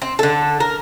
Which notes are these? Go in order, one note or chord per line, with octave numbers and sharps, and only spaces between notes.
C4
D3 A4
A#4